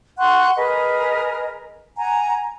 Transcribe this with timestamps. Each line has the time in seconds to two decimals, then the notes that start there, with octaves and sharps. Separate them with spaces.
0.18 F#5 C6 C#6 F#6
0.57 G#4 A#4 B4 D#5
1.97 F#5 G#5 A#5